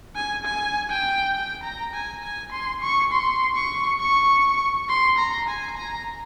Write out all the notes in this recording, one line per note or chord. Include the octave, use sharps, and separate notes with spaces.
G#5
G#5
G5
G5
A#5
G#5
G#5
C6
C#6
C6
C#6
C#6
C6
A#5
G#5
A#5